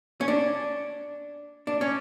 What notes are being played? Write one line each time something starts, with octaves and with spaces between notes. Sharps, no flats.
C#4
D4
D4
C#4